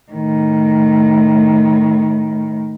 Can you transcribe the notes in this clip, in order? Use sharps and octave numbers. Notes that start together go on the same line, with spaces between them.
A2 D#3